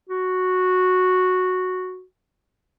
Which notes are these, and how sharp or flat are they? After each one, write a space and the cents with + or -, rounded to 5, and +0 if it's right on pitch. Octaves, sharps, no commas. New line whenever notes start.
F#4 -5